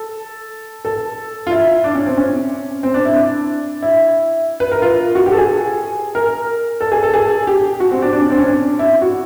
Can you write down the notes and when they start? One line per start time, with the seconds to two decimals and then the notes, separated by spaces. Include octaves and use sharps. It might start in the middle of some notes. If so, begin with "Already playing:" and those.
Already playing: A4
0.85 A4
1.47 F4
1.51 E4
1.84 D4
1.95 C#4
2.06 C4
2.17 C#4
2.83 C4
2.94 D4
3.05 E4
3.16 D4
3.83 E4
4.60 B4
4.71 A#4
4.82 F4
5.15 F#4
5.26 G4
5.32 A4
5.37 G#4
6.15 A#4
6.81 A4
6.92 G#4
7.03 A4
7.14 G#4
7.47 G4
7.80 F#4
7.91 C4
8.02 D4
8.13 D4
8.21 C#4
8.30 C4
8.38 C#4
8.46 D4
8.79 E4
9.02 F#4